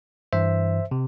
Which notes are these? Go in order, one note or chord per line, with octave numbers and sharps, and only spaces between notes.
G2 E3 C5 E5
C3